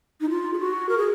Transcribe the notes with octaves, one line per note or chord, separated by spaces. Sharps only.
D#4
F4
G#4
F#4
A#4
G#4